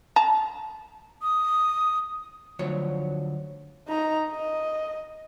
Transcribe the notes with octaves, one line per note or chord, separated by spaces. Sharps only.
A5 A#5
D#6
D2 F3 F#3 C#5
D#4 A#5
D#5